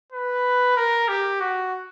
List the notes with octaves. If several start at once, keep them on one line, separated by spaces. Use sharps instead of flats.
B4
A#4
G4
F#4